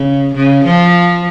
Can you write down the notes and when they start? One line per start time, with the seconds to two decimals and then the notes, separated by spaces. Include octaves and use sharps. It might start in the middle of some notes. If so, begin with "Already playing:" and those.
Already playing: C#3
0.35 C#3
0.65 F3